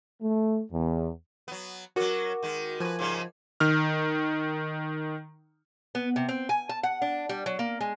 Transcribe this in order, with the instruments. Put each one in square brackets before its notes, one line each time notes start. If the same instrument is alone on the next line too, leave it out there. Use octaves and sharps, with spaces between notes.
[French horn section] A3
E2
[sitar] F#3 B3
[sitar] F#3 C#4 [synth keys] F#4 [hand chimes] A#4 D6
[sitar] D#3 G#3
[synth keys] F3 G#5 [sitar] F#4 B4
[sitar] G#2 C#3 G3
[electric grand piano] D#3 F6
[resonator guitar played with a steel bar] B3
C3
C4
G#5
A5
F#5
D4
G3
F#3
A#3
G#3